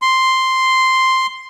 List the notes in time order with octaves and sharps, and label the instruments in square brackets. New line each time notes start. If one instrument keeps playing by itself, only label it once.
[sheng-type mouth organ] C6